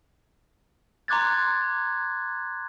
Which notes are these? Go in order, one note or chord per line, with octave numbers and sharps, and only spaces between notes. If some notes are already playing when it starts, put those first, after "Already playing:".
A#5 C6 D6 F#6 G#6 A6